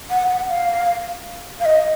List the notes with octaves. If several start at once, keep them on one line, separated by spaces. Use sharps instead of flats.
F#5
F#5
F5
F5
D#5